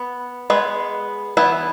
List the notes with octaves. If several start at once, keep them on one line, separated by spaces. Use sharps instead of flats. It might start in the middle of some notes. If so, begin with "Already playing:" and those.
Already playing: B3
G#3 B3 G#4 B4
E3 B3 E4 B4